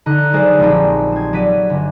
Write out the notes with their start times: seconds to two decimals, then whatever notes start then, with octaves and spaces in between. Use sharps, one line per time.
0.06 D3 D#4 F#6
0.33 F#3 G#3 G#4 A#4 C5 D5
0.59 A#1 G#3 C4 D#4 G4
1.12 C4 G#6
1.33 F#3 D5 B6 D#7
1.70 G1